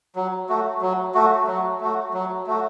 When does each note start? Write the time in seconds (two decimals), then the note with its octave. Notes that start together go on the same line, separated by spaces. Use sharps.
0.16 F#3
0.49 A3 F#4
0.81 F#3
1.14 A3 F#4
1.47 F#3
1.81 A3 F#4
2.14 F#3
2.47 A3 F#4